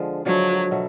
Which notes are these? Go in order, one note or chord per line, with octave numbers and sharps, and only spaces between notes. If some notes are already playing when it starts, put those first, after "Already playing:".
Already playing: D3 F3 G#3
D3 F3 F#3 G#3
B2 F#3 A3